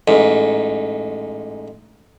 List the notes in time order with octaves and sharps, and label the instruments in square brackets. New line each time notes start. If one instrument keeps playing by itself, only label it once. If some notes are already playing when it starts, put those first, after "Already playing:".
[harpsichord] A1 G#2